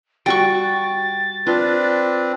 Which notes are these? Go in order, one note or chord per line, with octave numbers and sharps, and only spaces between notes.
G3 F#4 G5 C#6 A6
C4 D4 F4 B4